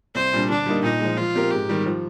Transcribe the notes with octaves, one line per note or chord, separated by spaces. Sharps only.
C2 C5
A#2 G3 D4
D3 D4
G3 A#3 D#4
A#2 D#4
G#3
F3
F3 F4
C4 G4 A#4
G#2 G4
D#3 G3
F3